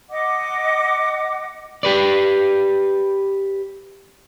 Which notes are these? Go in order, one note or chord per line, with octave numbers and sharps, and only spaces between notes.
D#5 F#5 D6
G4 B4 D5